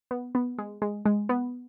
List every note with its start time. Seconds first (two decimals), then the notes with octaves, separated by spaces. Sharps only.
0.11 B3
0.35 B3
0.58 G#3
0.82 G#3
1.06 G#3
1.29 B3